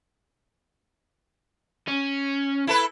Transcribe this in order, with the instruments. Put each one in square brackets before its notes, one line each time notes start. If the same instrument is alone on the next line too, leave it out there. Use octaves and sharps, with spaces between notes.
[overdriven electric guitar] C#4
[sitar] E4 A4 B4